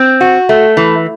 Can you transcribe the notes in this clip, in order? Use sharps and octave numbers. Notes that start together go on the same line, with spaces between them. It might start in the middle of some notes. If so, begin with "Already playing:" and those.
Already playing: C4
F#4
A3
E3